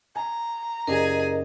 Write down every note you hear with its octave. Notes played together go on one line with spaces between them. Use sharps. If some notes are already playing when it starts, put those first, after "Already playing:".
G#5 A#5
F#1 G4 G#4 A#4 D5 D#5 G#5